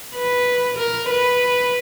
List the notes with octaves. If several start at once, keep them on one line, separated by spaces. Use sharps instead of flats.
B4
A#4
B4